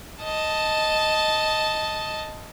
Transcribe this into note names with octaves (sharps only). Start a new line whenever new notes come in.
D#5 A5